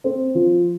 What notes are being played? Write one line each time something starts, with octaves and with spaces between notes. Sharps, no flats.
C4
F3